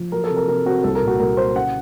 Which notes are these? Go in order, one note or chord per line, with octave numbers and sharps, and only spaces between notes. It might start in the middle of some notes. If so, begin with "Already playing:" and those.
Already playing: F3
F#3 A#4
A4
C3
A#4
C3 A#4
C4 F#4
C2 A4
A#4
A#2
F#4
C2 A#4
F#3 C5
C#3 F#5